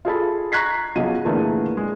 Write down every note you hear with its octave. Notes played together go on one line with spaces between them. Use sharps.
F4 G#4 A4 B5
A#5 C#6 F#6 G#6 B6 C7
B1 C#3 F3 F#3 D#7
A#2 D3 E3 A3 A#3 G#4
G#3